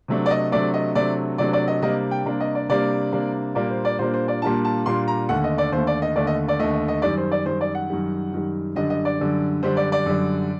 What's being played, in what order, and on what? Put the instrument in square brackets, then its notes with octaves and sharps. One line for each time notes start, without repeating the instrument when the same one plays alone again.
[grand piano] C3 F#3 A3 D4
D5
D#5
C3 F#3 A3 D4 D5
D#5
C3 F#3 A3 D4 D5
C3 F#3 A3 D4 D5
D5
D#5
C3 G3 A#3 D4 D#5
G5
C3 G3 A#3 D4
D#5
D5
C3 G3 A#3 D4 D5
C3 G3 A#3 D4
A#2 G3 A#3 D4 D5
C5
D5
A#2 G3 A#3 D4 C5
C5
D5
A#2 G3 A#3 D4 A5
A5
A#2 G3 A#3 D4 C6
A#5
D#2 D3 A3 F#5
D#5
D5
D#2 D3 A3 C5
D5
D#5
D#2 D3 A3 D5
D#5
D5
D#2 D3 A3 D#5
D#5
D#5
F#2 D#3 G3 D5
C5
D5
F#2 D#3 G3 C5
D5
F#5
F#2 D#3 G3
F#2 D#3 G3
F#2 D3 G3 D4 D#5
D#5
D5
F#2 D3 G3 D4
F#2 D3 G3 D4 C5
D5
D5
F#2 D3 G3 D4